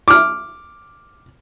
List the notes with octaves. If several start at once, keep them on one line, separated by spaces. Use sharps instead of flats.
D6 F6